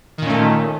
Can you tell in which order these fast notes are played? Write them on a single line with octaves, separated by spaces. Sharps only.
D#3 A#2 C#4 A3